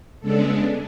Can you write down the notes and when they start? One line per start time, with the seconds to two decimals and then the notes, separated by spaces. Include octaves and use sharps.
0.20 C#3 G#3 B3 D4 A4